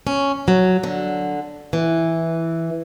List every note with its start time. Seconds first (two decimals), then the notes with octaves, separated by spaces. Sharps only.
0.07 C#4
0.48 F#3
0.83 D3
1.73 E3